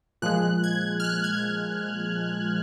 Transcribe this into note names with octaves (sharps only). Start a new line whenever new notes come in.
A#2 F3 G#3 F#6
G#6
F6
F#6
G#6